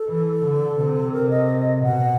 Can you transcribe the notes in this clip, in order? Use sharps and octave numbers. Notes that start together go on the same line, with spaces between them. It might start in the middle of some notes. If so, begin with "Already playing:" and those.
Already playing: A4
E3
D3
C3
A#4
D#5
B2 F#5